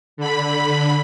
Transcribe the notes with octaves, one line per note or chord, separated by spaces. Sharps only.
D3 B5